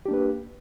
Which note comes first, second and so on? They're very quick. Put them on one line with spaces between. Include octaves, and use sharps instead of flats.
G4 D4 A#3 B4